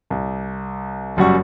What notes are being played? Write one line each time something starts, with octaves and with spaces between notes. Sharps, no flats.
C2
F#1 F#2 G3 F#5 C#6